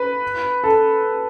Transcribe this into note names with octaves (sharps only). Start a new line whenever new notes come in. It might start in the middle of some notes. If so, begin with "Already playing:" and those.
Already playing: B4
A4